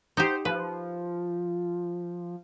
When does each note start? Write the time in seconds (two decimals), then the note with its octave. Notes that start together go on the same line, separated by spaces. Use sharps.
0.17 D#4 G4 C5
0.45 F3 B4